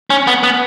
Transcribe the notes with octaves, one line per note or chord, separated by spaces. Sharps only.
C#4
B3
B3